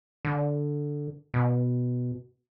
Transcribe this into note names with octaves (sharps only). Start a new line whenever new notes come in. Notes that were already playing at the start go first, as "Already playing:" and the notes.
D3
B2